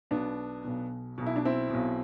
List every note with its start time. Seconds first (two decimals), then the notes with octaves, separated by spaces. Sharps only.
0.11 B1 B2 B3 D4
0.64 B1 B2
1.18 B1 B2
1.26 E4
1.36 D4
1.45 C4 E4
1.70 B1 B2